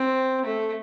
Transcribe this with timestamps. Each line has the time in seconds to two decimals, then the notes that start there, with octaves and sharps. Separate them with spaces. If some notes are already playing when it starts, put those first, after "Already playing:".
Already playing: C4
0.46 A3